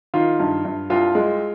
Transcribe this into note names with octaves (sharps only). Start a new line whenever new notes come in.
D#3 F4 F5
G2
G2
C2 F4 F5
G#3